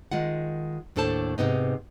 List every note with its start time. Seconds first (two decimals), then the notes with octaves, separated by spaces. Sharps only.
0.12 D#3 G#3 F4 F#5
0.96 D#2 A2 D4 A4 C5 A5
1.38 G#2 C3 B3 D#4